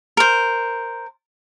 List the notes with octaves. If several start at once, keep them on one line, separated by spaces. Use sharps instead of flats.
A#4 C5